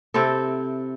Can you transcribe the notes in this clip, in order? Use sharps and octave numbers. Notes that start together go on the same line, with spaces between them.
C3 C4 E4 A4